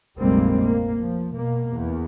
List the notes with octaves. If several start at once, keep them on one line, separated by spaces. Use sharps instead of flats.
F1 A#1 G3 G#3 A#3 C4
A#3
F3
B2 A#3
E2